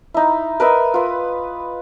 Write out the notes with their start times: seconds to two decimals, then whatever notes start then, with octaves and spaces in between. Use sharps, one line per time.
0.14 D#4 E4
0.60 A#4 B4 D#5 E5
0.94 F4 B4